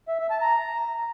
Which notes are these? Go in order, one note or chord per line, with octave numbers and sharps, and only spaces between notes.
E5
E5
A5
A#5